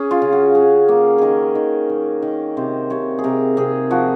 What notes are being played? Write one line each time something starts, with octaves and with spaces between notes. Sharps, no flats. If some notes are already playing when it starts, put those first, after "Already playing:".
Already playing: C#4 G#4
F4
C#3
F#4
C#4 G#4
A#3
D#3 G#4 A#4
D#3
D#3
D#3
C3 C5
C3 C#5
G#4
C3 A#4
C3 G#4
F3 F#4